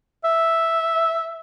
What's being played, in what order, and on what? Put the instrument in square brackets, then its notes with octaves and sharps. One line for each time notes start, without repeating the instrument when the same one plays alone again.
[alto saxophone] E5